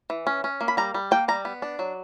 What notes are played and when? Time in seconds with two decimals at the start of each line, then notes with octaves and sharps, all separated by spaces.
0.10 E3
0.27 C#4
0.44 C#4
0.61 A#3
0.68 B5
0.77 G3 A#5
0.94 G3
1.11 A#3 G5
1.28 G3 A#5
1.45 B3
1.62 D4
1.79 F#3